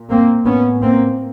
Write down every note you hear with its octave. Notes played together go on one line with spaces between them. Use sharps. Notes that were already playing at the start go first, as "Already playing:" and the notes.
Already playing: A#2
A#3 C4
A2 B3 C#4
A#3 C4